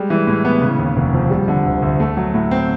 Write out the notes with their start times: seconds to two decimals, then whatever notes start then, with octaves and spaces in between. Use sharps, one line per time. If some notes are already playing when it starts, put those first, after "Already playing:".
Already playing: G3 G#3
0.10 E3
0.27 A2
0.45 B3
0.61 C#3
0.79 D#2
0.96 F1
1.14 F3
1.30 G3
1.48 D3
1.65 D2
1.82 D2
2.00 A3
2.17 F#3
2.34 A2
2.51 C4